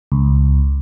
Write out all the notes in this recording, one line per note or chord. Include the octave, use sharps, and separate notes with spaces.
C#2